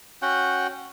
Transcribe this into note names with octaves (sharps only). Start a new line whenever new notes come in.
C#4 F#4 F#5 G5